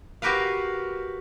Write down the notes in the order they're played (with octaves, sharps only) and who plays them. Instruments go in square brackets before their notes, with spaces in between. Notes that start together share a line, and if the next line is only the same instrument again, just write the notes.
[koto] F#4 G4 A#4 B4 F5